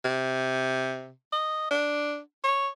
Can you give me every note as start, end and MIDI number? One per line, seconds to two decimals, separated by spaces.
0.05 1.10 48
1.32 1.67 75
1.71 2.18 62
2.44 2.69 73